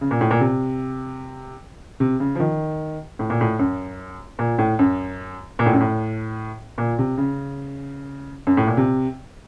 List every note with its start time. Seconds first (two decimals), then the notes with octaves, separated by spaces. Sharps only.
0.01 C#3
0.11 A#2
0.21 A2
0.31 A#2
0.41 C3
2.00 C3
2.20 C#3
2.36 F3
2.40 D#3
3.19 A2
3.30 A#2
3.41 A2
3.59 F#2
4.39 A#2
4.58 A2
4.79 F#2
5.59 A#2
5.66 A2
5.73 F#2
5.81 A2
6.78 A#2
6.98 C3
7.18 C#3
8.47 F#2
8.57 A2
8.67 A#2
8.77 C3